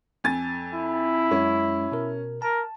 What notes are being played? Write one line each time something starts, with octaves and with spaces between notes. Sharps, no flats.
F2 G#5 A6
E4
F#2 G#3 C#4
B2 A#4
A#4 A5